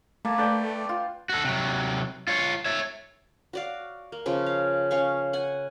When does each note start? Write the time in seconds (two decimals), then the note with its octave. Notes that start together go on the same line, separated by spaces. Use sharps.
0.25 A3 A#3 A5
0.38 B4 D5 G5
0.89 F4
1.29 F#4 A4
1.45 C3 F#3
2.28 F4 C#5
2.65 C#5 E5
3.53 F#4 D5 F5
4.12 A#3
4.26 C#3 F3 C#4
4.46 F5
4.91 C#4 F5 C#6
5.33 F#5 G#5